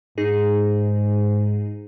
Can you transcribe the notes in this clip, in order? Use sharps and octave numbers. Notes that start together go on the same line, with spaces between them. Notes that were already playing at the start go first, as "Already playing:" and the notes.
G#2 D#4 G#4